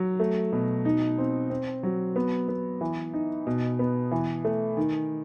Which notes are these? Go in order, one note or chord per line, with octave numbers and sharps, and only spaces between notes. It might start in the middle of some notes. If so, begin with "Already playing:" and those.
Already playing: F#3
A3
B2
D#4
C4
C4
F#3
B3
B3
E3
D#4
B2
B3
E3
A3
D#3